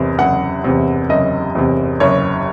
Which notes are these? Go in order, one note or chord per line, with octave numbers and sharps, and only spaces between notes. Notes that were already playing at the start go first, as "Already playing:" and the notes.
Already playing: F#1 E2 C3
F#1 F#5
E2 C3
F#1 D#5
E2 C3
F#1 C#5